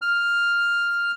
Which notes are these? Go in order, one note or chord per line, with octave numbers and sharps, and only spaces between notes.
F6